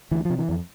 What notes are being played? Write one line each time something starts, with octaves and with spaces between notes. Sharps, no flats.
D2 E3
C3 F3
E3
F2